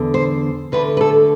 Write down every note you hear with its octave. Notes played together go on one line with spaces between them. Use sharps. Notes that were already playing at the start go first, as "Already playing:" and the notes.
Already playing: E2 D3
C5
D2 D3 B4
B4
A4